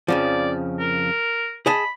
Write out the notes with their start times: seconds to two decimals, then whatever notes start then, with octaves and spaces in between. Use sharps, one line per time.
0.08 F2 C#3 F3 D5
0.80 A#4
1.66 G#4 D#5 A5 B5